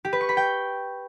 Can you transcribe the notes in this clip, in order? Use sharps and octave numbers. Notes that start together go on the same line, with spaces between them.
G4
B4
C#6
B5
G5